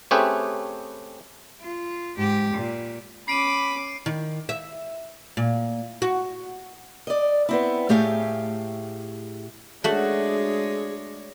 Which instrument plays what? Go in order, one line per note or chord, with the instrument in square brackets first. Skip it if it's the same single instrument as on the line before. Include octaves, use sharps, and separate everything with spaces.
[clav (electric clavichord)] A3 C4 C#4 G4 G#4 B4
[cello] F4
G#2 G4
A#2
[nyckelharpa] C#4 D6 [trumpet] B5 [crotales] C7 D7 D#7
[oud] D#3
E5
A#2
F#4
[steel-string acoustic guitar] D5 D#5
B3 C4 E4
A2 A3 G4 G#4 F5
[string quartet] G#3 D4 C#5 [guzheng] A3 F#4 [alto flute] G#4